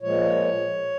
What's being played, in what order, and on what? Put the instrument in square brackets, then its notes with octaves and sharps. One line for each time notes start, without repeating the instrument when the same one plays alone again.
[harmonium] A#2 F3 G#3 C#5